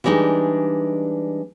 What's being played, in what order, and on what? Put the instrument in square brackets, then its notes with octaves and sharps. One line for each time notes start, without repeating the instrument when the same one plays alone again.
[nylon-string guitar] E3 G3 G#3 D4 D#4